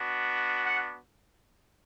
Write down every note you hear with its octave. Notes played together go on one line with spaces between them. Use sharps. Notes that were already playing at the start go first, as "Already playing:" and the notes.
Already playing: B3 D4 F#4
F#5